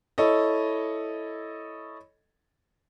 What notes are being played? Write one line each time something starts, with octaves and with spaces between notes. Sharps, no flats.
E4 A4 C#5 D#5